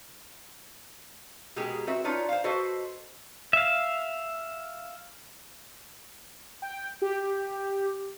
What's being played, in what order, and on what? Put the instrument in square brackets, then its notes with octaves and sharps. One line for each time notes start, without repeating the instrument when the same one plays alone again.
[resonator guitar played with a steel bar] B2 G#3 A#3 G4 G#4
C4 F#4 B4 E5
D4 D#4 F4 B4 C#5
C5 F5
F#4 A4 B4 C5 D#5
[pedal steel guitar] E5 F5
[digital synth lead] G5
G4